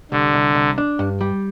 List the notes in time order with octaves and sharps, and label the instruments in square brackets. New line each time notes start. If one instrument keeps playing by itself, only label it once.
[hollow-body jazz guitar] C2 [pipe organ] D3
[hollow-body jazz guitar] C2
C2
D4
G2
G3